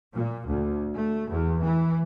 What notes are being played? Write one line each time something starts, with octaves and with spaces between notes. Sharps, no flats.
A#2
D2
A3
E2
E3